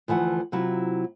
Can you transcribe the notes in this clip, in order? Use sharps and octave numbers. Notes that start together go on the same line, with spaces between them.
D2 E3 F3 F#5
C3 F#3 E4 F4